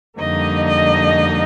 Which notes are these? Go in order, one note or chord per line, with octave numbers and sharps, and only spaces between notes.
F2 D3 G3 A#3 D#4 D#5
D#5